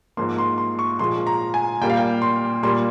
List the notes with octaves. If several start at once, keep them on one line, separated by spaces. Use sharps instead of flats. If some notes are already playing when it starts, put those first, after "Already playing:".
G#2 F3 A#3 C6
C6
C6
C#6
A#2 F3 G#3 C6
A#5
G#5
A#2 G3 A#3 G5
F5
G5
C6
A#2 G3 A#3 C6